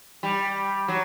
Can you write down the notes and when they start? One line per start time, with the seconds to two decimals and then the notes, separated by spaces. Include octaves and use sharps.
0.23 G3
0.88 F#3